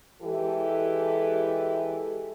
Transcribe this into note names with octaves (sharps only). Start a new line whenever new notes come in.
E3 G#3 G4 A4